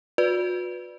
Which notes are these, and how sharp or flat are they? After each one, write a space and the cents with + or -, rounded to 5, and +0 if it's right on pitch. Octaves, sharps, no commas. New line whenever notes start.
F#4 -45 B4 +0 D5 +0